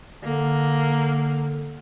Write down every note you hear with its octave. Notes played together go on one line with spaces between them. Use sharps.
D3 A#3